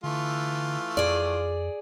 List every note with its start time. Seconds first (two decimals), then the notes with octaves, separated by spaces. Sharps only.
0.04 D3 E3 A3 F4
0.97 F2 G#4 D5